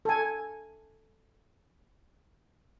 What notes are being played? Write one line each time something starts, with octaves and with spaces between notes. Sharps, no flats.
A4 G#5